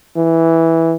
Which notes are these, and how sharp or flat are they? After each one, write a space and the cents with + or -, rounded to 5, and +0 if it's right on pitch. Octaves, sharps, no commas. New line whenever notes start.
E3 -5